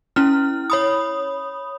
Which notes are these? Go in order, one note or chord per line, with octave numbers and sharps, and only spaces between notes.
C#4 E4 F6
C#5 B5 D#6